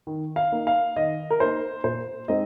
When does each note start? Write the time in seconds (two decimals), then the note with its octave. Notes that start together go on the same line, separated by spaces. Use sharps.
0.07 D#3
0.36 F5
0.52 A#3 D#4
0.67 F5
0.96 D#3 D#5
1.30 A#4
1.40 A#3 D#4 C5
1.84 A#2 C5
2.28 G#3 C4 D#4 D#5